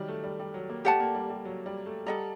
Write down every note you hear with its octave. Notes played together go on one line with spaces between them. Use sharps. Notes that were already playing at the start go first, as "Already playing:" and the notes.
Already playing: D#3 F#3 G3
A3
G3
G3
F#3
A#3
A3 G4 D5 F#5 A5
A#3
G3
G3
F#3
G3
A3
G3 A4 D#5 F#5 A#5